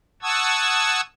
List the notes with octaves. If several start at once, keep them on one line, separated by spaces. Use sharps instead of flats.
F#5 A5 C#6 D#6 E6 G#6